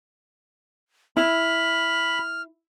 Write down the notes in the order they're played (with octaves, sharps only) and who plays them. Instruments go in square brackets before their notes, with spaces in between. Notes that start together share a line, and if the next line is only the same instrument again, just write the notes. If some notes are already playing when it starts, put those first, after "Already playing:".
[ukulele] E4 [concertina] B5 [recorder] F6